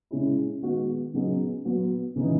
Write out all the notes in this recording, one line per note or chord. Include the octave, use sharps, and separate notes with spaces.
C#3 G#3 C#4 E4
D#3 G#3 B3 F#4
C#3 F#3 B3 D#4 G#4
F#3 B3 F#4
C#3 E3 G#3 D#4